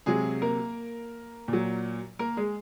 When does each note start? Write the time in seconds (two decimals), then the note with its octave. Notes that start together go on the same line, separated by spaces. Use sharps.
0.06 C3 F#3 G#3 G#4
0.42 A#3 A#4
1.48 A#2
1.53 F#3
2.19 A#3 A#4
2.37 G#3 G#4